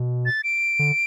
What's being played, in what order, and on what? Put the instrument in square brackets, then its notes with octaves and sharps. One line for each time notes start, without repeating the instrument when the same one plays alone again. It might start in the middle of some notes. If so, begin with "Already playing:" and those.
Already playing: [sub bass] B2
[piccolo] A6
D7
[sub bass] D3